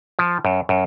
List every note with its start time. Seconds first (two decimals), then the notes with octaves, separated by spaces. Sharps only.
0.19 F3
0.45 F#2
0.69 F#2